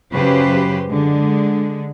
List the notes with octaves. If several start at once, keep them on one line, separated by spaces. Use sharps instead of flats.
F#2 C#3 F#3 G4 B4 C5
D3 G#3